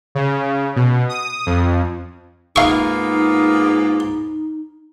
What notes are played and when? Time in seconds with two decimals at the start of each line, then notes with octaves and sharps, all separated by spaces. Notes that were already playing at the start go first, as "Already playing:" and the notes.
0.15 C#3
0.76 B2
1.09 D#6
1.46 F2
2.56 G#2 A#3 B3 D#4 F4 F5 C#6